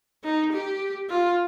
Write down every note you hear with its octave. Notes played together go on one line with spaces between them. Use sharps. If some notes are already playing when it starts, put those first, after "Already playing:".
D#4
G4
F4